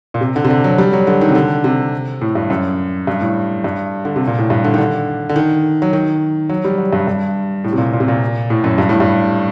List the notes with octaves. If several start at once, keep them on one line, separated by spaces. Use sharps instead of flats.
A#2
C3
D3
C3
D3
F#3
G3
F#3
D3
D#3
C3
D3
C3
A2
G2
F#2
G2
A2
G2
D3
C3
A#2
A2
G2
D3
D#3
D3
D3
D#3
F#3
D#3
F#3
G3
F#3
G2
G2
A2
C3
A#2
A#2
C3
A#2
A2
F#2
G2
A2
G2